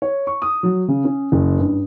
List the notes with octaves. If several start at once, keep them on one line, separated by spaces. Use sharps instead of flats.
C#5
C#6
D#6
F#3
C#3
C#4
F#1
G2